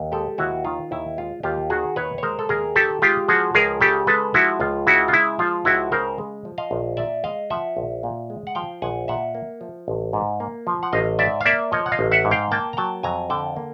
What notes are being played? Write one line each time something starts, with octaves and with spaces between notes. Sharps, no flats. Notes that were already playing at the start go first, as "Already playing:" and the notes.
Already playing: D#2
G#3 G4 A4
D#2 E4 F#4
D#3 F4
D#2 E4
G#3 F4
D#2 F4 G4
D#3 F#4 G#4
D#2 B4 C#5
C#5
G#3 A#4 C5
A4
D#2 G#4 A#4
D#3 G4 A4
G#3 F4 G4
F3 F#4 G#4
C#2 G#4 A#4
C#3 G4 A4
G#3 A4 B4
F3 E4 F#4
C#2 F4
C#3 E4 F#4
F4
G#3 E4
F3 F4
C#2 E4 F#4
C#3 A#4 C5
G#3
F3
D#5 F5
A#1
A#2 D5 E5
G#3 D#5 F5
F3 E5 F#5
A#1
A#2
G#3
F#5
F3 F5 G5
A#1 F#5 G#5
A#2 E5 F#5
A#3
F3
A1
G#2
A#3
F3
F#5
A1 D#5 F5
G#2 D5 E5
F5
A#3 D5 E5
F3 C#5 D#5
F#5
D#5 F5
A1
E5 F#5
G#2
F5 G5
A#3 G5 A5
A#5
F#3 G5 A5
F2 G#5 A#5
D3 G5 A5
A#3